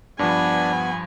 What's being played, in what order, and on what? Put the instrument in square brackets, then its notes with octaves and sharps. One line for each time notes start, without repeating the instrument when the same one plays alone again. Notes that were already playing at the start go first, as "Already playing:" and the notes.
[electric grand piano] G2 F3 [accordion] B3 [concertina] D4 [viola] G#5 B5